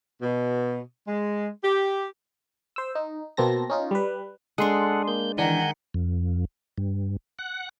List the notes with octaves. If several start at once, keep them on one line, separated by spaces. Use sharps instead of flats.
B2
G#3
G4
C5 E6
D#4
B2 A#3 C4 A5 A#6
C#4 D#4 F4
G3 B4
G#3 D4 A4 F#5 C6 D#6
A#3 G6
D#3 E3 D4 F#5 G#5 G6
F2
G2
F#5